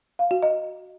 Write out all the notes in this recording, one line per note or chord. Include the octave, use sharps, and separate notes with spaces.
F5
F#4
D#5